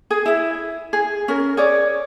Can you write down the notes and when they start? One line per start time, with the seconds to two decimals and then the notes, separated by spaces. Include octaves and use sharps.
0.10 G#4
0.26 E4 E5
0.93 G#4
1.28 C#4 A#4
1.57 G#4 C#5 D5